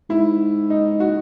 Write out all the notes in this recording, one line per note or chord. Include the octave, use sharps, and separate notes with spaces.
G#2 E4
D#4
F#4